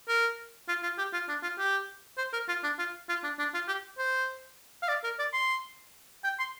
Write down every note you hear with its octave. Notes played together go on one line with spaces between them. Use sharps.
A#4
F4
F4
G4
F4
D4
F4
G4
C5
A#4
F4
D4
F4
F4
D4
D4
F4
G4
C5
F5
D5
A#4
D5
C6
G5
C6